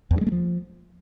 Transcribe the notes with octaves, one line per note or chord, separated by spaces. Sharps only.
E2
G2
G#3
A3
F3